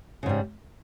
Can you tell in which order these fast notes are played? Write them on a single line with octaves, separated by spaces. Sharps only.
C#3 G#2 G3